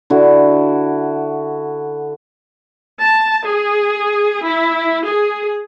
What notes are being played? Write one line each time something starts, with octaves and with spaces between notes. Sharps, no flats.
D3 E4 F#4
A5
G#4
E4
G#4